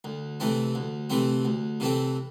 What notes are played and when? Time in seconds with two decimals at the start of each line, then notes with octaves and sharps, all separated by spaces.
0.04 D2
0.40 C3 E3 A3 C4
0.75 D2
1.10 C3 E3 A3 C4
1.45 D2
1.80 C3 E3 A3 C4